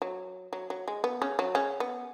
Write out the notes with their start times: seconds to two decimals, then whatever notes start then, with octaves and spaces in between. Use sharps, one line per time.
0.02 F#3
0.53 F#3
0.70 F#3
0.88 G#3
1.04 B3
1.22 C#3 C#4
1.39 F#3
1.55 C#3 C#4
1.80 B3